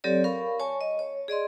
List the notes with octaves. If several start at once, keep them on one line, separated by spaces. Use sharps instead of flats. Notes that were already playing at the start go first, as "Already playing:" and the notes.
F#3 C4 G4 A4 C#5 D5
A#4 F5 B5 C#6
C#5 G#5 A5 C#6
D#5
C#5
G#4 D5 D#5 C6